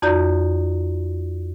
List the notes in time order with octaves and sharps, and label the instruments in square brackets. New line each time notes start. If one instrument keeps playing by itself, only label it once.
[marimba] F2 D#4 F#4 D5 A#5 G6